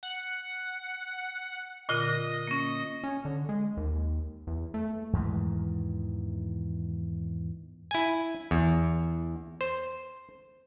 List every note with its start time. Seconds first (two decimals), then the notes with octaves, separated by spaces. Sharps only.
0.03 F#5
1.89 A#2 D3 F4 D#5
2.47 A#3 C#4
3.04 C#4
3.25 D3
3.49 G#3
3.77 D#2
4.47 E2
4.74 A3
5.13 E2 G#2 D#3 E3
7.91 E4 G#5
8.51 E2
9.61 C5